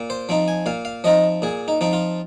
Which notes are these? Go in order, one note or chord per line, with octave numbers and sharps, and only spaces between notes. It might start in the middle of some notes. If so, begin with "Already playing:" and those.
Already playing: A#2
C5
F3 C4 D#4
G#5
A#2 F5
F5
F3 C4 D#4 D#5
A#2 G#4
D#4
F3 C4 D#4
F4